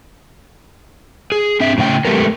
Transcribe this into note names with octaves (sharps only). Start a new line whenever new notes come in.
G#4
C4 D4 E5
A2 C#3 F5 G5
G#3 A3 B3 G4 A4 A#4